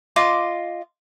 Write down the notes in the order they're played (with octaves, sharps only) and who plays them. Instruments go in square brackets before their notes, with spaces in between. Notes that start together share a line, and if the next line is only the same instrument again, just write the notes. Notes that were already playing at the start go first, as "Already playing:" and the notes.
[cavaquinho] F4 D#5 C6 D6